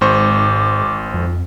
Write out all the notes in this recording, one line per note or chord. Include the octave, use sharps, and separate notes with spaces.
G#1 G#2 C5 C#6 D6
F2